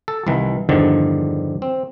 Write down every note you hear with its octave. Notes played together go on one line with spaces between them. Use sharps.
A4
C2 D#3 E3
E2 G2 D3 D#3 F3
C4